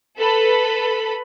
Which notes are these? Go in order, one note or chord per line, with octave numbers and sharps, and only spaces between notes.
A4 B4 B5